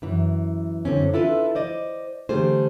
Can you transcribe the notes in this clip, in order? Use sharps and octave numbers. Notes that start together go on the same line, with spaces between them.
F#2 E3
F#2 D3 C4 C#4
D4 E4 F4 A4 B4
C5 D5 D#5
D3 E3 G3 A3 G#4 C5